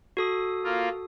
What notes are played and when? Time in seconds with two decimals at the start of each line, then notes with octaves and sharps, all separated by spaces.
0.17 F#4 A4 D#6
0.64 A#3 F4